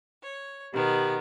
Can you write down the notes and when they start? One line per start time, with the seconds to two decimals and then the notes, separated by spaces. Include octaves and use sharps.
0.22 C#5
0.73 B2 D#3 B3 G4